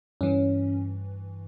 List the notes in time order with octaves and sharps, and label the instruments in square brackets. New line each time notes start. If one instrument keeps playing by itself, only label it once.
[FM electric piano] G2 E3 C#4